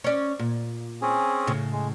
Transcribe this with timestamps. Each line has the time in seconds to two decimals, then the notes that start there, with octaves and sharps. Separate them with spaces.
0.04 C#4 D5
0.39 A#2
1.02 C4 C#4 G#4
1.47 A2 C#3
1.72 G#3